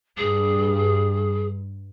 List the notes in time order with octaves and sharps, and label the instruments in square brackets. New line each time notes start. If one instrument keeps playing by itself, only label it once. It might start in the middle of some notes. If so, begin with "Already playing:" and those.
[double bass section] G2 [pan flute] G#4